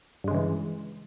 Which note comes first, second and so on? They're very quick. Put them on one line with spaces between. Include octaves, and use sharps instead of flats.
G2 G#3 C#3 E3